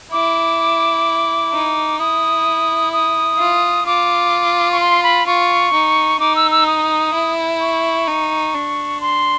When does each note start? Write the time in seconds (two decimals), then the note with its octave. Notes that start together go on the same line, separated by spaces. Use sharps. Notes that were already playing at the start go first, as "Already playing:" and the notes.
0.12 E4 D6
1.52 D#4
1.99 E4 D#6
2.93 D#6
3.39 F4
3.86 F4 D6
4.72 C#6
4.80 C6
5.03 B5
5.27 F4 C#6
5.73 D#4
6.20 D#4 D6
6.36 E6
6.51 E6
6.67 D#6
7.14 E4
7.61 C#6
8.07 D#4
8.54 D4
9.01 C6